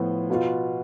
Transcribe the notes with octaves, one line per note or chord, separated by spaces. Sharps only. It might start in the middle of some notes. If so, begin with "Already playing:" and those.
Already playing: A2 F3 B3 F4
B2 B3 F4